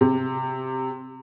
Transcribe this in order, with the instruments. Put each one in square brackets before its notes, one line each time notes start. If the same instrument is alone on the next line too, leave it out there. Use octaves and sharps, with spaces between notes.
[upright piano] C3